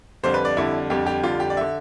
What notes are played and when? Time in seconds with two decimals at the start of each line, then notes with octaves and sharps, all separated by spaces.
0.23 F2 D3 G3 C5
0.34 B4
0.45 D5
0.57 F2 D3 G3 E4
0.90 F2 D3 G3 G4
1.06 G4
1.23 F2 D3 G3 F4
1.40 G4
1.50 D5
1.57 D3 E5